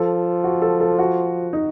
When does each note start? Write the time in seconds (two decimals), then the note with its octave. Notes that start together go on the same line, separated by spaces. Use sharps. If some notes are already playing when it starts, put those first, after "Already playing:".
Already playing: F3 A4
0.44 F#4
0.62 A4
0.81 A4
0.98 F#4
1.53 D#4